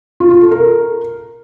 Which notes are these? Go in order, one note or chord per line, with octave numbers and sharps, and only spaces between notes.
F4
F4
A4
A#4